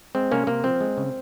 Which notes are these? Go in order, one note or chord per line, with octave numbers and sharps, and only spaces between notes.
G#3 C4
C3 A#3 C#4
C3 A#3
F3 C4
G#3
C#3